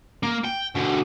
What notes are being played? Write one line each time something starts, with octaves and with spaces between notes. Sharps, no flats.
A#3
G5
D2 B2